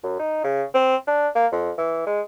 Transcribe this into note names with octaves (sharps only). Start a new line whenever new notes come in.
F#2
D#4
C#3
C4
D4
A#3
F2
E3
G#3